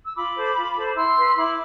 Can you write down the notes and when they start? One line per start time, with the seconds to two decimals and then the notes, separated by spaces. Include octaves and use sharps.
0.07 E6
0.16 F4 B5 D6
0.36 A4 C5
0.57 F4
0.76 A4 C5
0.96 E4 C6 E6
1.16 B4
1.36 E4 B5 D6